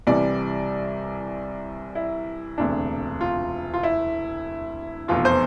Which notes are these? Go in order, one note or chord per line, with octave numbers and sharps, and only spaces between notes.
C2 C3 E3 G3 D5
E4
E1 D2 C3 D4
F4
F4
E4
F1 E2 B2 F4
C5